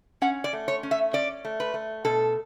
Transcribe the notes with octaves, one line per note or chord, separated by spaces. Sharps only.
C#4 F#5
D5
A3
C#5
C#4
E5
C#4 D5
A3
B4
A3
B2 A4